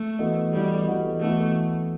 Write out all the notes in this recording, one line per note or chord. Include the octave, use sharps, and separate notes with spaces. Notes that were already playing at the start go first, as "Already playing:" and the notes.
Already playing: A3
E3 B3 F#4 A4 D#5
E3 G3 B3 F#4 A4 D#5
E3 B3 F#4 A4 D#5
E3 A3 B3 F#4 A4 D#5